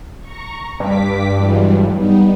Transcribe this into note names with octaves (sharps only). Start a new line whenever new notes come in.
A#5 C#6
G2 D6 B6
E3 F#3 G#3
G3 B3 D#4